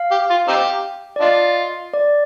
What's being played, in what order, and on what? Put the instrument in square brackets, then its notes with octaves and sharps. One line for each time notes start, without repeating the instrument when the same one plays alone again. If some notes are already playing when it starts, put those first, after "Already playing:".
Already playing: [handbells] F5
[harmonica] G4
F4
C4 D#4 G4
[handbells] D5
[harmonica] D4 F4 [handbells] D#5
[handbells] D5